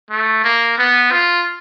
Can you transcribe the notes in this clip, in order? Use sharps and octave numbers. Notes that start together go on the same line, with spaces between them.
A3
A#3
B3
F4